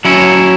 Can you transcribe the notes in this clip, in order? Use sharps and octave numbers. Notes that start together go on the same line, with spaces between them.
F#3 C#4 E4